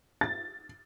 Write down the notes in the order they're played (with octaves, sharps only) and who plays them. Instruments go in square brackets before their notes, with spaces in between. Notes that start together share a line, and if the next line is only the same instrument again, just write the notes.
[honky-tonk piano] A6